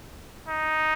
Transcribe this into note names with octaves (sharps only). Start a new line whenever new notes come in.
D#4